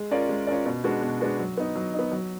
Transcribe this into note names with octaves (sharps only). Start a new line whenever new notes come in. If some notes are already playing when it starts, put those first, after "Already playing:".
Already playing: G#3
C#4 F4 A#4 D5
G#3
C#4 F4 A#4 D5
B2
G#3 B3 D4 F#4
B2
G#3 B3 D4 F#4
F#3
B3 D#4
F#3
B3 D#4
F#3